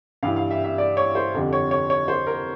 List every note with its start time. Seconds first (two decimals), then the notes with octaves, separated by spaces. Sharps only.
0.23 G2 E3 G3 F5
0.36 F5
0.51 E5
0.64 E5
0.78 D5
0.97 C#5
1.15 C5
1.34 F2 D3 G3
1.53 C#5
1.71 C#5
1.90 C#5
2.08 C5
2.27 A#4